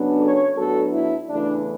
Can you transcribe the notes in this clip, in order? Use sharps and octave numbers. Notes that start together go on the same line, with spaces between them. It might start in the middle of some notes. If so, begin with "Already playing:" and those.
Already playing: C#3 F#3 B3 D4
A4 C#5
A2 F#3 B3 D4 F#4 A4
E4
E2 C#3 E3 A3 D4